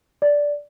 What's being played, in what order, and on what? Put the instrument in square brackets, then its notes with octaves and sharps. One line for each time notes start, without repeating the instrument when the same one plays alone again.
[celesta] D5